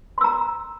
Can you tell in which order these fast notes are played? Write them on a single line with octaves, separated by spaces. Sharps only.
C6 E6 A#5